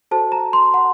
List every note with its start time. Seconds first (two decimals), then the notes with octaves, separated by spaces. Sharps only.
0.11 F#4 A4 C5 A5
0.32 A#5
0.53 C6
0.74 F#5